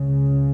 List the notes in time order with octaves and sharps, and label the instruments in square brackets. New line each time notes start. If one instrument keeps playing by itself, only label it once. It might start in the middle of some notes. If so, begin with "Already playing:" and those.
Already playing: [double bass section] C#2 C#3